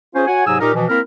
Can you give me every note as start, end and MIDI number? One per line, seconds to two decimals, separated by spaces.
0.15 0.26 61
0.15 0.26 65
0.15 0.26 68
0.15 0.26 72
0.27 0.44 66
0.27 0.44 73
0.27 0.44 78
0.27 0.44 80
0.46 0.58 44
0.46 0.58 48
0.46 0.58 54
0.46 0.58 68
0.46 0.58 80
0.46 0.58 88
0.60 0.72 46
0.60 0.72 63
0.60 0.72 67
0.60 0.72 70
0.74 0.85 47
0.74 0.85 52
0.74 0.85 53
0.89 1.00 58
0.89 1.00 60
0.89 1.00 64
0.89 1.00 70